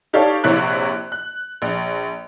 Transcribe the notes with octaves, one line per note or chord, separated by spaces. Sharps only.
D#4 G4 A4 C#5 D5 F5
A#1 C3 A#3 E4 C#5 F#6
F#6
A#1